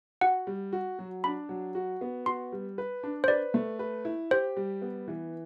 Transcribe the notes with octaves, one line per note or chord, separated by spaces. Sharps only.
F#4 F#5
G3
F#4
F#3
D4 B5
F#3
F#4
B3
F#4 C6
G3
B4
D4
C5
B4 D5
A3
B4
E4
G4 C5
G3
B3
E3